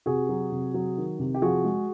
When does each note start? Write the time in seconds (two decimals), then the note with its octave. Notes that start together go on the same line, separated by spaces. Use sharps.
0.06 C3 F#4 G#4
0.29 F#3
0.52 C3
0.74 F#3
0.97 D#3
1.19 C3
1.35 G4
1.42 F3 F#4 G#4
1.64 G#3